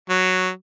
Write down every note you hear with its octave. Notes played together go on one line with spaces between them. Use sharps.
F#3